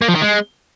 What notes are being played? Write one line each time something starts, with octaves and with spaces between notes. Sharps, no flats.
A#3
F3
D#3
G#3